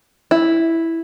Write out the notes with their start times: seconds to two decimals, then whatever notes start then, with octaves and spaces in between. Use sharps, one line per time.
0.31 E4